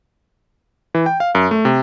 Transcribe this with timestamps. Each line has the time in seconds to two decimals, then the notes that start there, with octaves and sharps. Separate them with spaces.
0.95 E3
1.06 G5
1.20 F5
1.35 F#2
1.51 A3
1.65 C3